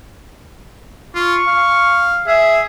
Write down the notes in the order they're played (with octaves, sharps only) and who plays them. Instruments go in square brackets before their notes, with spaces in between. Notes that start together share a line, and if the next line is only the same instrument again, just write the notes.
[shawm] F4 [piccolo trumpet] C#6
[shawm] F5
[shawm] G#4 [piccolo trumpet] E5